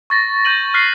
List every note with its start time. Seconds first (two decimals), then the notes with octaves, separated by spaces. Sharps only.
0.10 C#6 A6 A#6
0.45 G6 A6 D#7 F#7
0.74 F6 F#6 B6 C7